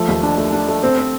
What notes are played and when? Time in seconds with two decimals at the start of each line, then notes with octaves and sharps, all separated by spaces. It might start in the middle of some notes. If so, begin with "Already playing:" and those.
Already playing: F3 A3
0.08 D#2
0.23 D4
0.38 A3
0.52 D4
0.68 A3
0.83 C4
0.98 C4